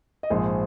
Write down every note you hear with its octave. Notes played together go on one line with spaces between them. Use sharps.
D#5
A#1 G#2 F3 G#4 C5